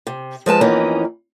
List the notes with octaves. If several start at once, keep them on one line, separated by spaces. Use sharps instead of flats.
C3
F3 G#3 B4 A5
F2 E3 A#3 B3 C#4 D#4